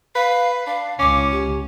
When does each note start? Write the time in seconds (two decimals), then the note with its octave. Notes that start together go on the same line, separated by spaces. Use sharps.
0.15 B4 F5
0.67 D4 F5
0.99 C#2 C#4 D6
1.31 G4